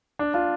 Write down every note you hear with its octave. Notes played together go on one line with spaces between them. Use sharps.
D4
D4 F4